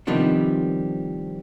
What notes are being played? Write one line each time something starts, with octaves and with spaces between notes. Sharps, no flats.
C3 D#3 F3 G3 B3 D4